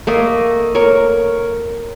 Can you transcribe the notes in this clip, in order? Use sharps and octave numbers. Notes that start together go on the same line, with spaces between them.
A3 A#3 D#5
A#4 C#5